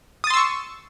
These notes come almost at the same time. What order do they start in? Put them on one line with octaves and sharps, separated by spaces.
D#6 A6 C6 E6 C#6